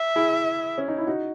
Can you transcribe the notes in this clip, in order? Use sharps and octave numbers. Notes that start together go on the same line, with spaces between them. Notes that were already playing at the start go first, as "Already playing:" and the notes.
Already playing: E5
E4 G#4
C#4
D#4
E4
D#4 F#4